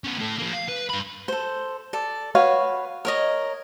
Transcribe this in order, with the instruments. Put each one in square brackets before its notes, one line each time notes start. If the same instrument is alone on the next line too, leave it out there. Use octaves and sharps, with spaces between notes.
[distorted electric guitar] B3 C#4
A2 A4
F3 A#3
F5
B4
G2 B5
[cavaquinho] A4 C5
A4 D5
F#4 B4 C#5 F5
A#4 C#5 D#5